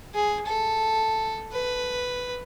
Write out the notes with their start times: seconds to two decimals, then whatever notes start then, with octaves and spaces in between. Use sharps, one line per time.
0.14 G#4
0.46 A4
1.52 B4